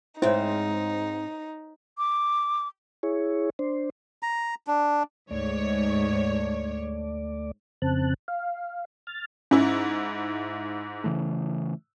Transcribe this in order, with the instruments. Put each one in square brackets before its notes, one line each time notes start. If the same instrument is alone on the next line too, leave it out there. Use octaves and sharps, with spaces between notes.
[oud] G#2 C4 [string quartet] D#4 [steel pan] E4 [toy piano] C5 C#5
[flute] D6
[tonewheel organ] E4 G#4 C#5
D4 C5
[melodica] A#5
D4
[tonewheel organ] D2 A3 D5 [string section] G#2 C#5
[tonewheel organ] F2 C#3 C4 A5 F#6
F5
F6 A6
[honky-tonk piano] G#2 E4 [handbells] C#4
[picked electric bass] C#3 E3 A3